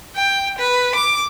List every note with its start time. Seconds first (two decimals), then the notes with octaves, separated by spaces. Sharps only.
0.15 G5
0.59 B4
0.95 D6